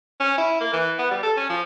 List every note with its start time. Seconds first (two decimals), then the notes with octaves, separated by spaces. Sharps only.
0.20 C#4
0.38 E4
0.61 A#3
0.73 E3
0.99 B3
1.11 G3
1.23 A4
1.37 C#4
1.50 F3